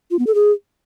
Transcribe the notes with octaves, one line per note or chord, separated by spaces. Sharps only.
F4
B3
A4
G#4